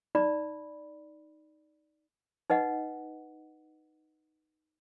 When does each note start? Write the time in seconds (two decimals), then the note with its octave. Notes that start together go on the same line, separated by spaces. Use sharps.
0.15 D#4 D5 B5
2.50 D#4 B4 D#5 F#5